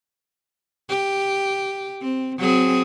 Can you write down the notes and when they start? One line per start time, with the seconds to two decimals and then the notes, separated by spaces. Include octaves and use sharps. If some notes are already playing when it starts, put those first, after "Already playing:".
0.89 G4
2.02 C4
2.38 F#3 C4 G#4